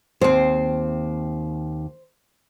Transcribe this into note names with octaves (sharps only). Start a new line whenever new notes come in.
D#2 C4 C5